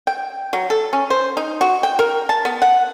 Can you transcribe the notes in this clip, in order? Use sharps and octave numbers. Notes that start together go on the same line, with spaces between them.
G5
F#3
A4
C#4
C5
D#4
F#4
G5
A#4
A5
B3
F#5